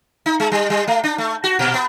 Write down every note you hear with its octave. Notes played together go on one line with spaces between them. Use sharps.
D#4
G#3
G3
G3
A3
D4
A3
F#4
A#2
B3